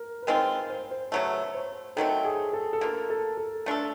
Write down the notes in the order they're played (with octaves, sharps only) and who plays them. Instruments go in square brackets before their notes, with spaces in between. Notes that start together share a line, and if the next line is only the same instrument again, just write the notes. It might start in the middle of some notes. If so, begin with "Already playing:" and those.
Already playing: [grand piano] A#4
B4
[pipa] D#3 G#3 C4 F4 [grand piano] A#4
[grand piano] C5
C5
[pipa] C#3 F#3 A3 [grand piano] B4
[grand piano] C5
[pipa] D#3 F#3 A3 C4 [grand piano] A4
[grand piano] G#4
A4
A4
[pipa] A#3 D4 F4 [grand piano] A#4
[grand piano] A4
A4
[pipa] A3 D4 F4 A4